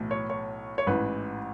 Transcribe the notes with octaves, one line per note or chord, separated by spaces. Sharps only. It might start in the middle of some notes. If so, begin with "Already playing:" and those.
Already playing: B1 A2 E3
C#5
C#5
C#5
A1 G#2 E3 B4